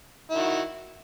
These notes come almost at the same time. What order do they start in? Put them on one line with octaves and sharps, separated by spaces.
E4 D#3 F#4